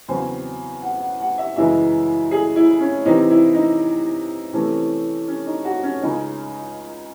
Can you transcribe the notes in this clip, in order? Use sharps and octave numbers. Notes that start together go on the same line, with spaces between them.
E2 C#3 F#3 C4 C5
F#5
F#5
F#5
E5
F#2 C#3 E3 G#3 E5
G#4
E4
C#4
C3 E3 C4 D#4
E4
D#4
C3 E3 A3 C#4
C#4
D#4
F#4
C#4
C#2 C#3 G#3 C#4 D#4